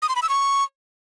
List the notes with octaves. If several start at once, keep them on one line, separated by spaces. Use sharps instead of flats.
D#6
C6
B5
E6
C#6